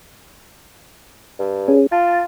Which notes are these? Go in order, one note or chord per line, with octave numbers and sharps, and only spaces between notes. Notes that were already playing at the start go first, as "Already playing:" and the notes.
G2
C#4 G#4
F4 A5